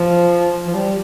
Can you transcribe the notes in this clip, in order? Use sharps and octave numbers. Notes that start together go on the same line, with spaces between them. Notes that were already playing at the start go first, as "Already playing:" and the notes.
Already playing: F3
F3
G3